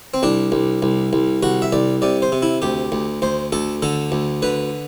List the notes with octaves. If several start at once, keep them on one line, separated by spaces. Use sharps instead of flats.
C4
C2 D4
C2
C2
C2
C2 F#4
E5
C2 D5
C3 D5
C5
C3
E4
D2 G4
D2
D2 C5
D2 A4
D3 A4
D2
D3 B4